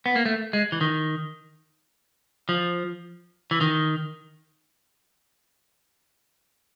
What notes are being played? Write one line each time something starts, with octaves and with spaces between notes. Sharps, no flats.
B3
A#3
A3
G#3
E3
D#3
F3
E3
D#3